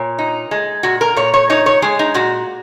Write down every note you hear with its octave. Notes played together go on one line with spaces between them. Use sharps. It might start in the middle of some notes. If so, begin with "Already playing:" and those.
Already playing: A#2 C#5
D#4
G#3
A#2 F#4
A#4
A#2 C#5
C#5
D#4 C#5
C#5
G#3 G#4
D#4
A#2 F#4